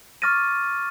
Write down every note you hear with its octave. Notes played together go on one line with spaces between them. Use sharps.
C#6 D6 F6 A6 A#6 D#7